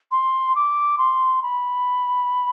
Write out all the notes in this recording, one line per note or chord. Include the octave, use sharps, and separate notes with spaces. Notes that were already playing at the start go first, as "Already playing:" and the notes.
C6
D6
C6
B5